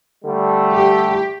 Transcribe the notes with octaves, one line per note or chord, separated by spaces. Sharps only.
D3 G3 A3
G4